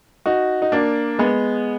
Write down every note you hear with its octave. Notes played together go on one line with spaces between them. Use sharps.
D#4 F#4
D#4
A#3 D4
G#3 B3